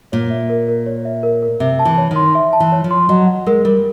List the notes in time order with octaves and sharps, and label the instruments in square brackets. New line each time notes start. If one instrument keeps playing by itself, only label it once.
[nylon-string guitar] A#2 [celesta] C#5
[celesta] E5
A#4
A#4
C#5
E5
A#4
A#4
[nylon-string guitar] C3 [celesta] E5
[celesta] A5
[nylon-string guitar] E3
[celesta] C#5
[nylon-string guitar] D#3
[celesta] C6
E5
A5
[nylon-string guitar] E3
[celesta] C#5
[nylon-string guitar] F3
[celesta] C6
[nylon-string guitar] F#3 [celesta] D#5
[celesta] F#5
[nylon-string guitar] G#3 [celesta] A#4
[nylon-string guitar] G3 [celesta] A#4